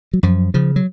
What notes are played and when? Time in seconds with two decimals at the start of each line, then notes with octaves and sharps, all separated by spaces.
0.13 F#3
0.23 F#2 F3
0.54 C#3 F3
0.76 F#3